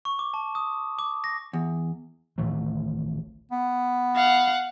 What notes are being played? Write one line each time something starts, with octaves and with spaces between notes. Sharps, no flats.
C#6
D6
A5
D#6
D6
A#6
E2
D1 A1 D#3 A3
B3
F5 F#5